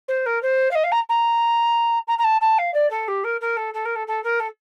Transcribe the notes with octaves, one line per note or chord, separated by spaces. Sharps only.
C5
A#4
C5
F5
D#5
F5
A#5
A#5
A#5
A#5
A5
A5
F5
D5
A4
G4
A#4
A#4
A4
A4
A#4
A4
A4
A#4
A4